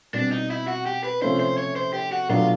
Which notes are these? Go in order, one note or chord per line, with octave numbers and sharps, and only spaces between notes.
B2 G3 C4 D4
D#4
E4
F#4
G4
B4
C3 F3 A3 C#4 C5
C5
C#5
C5
G4
F#4
B2 F#3 A3 D4 F4 F#4